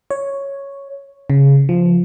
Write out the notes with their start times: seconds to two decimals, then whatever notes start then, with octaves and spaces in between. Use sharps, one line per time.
0.11 C#5
1.30 C#3
1.69 F3